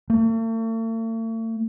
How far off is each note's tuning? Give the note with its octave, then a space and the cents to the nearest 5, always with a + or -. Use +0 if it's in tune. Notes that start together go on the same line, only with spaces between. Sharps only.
A3 +45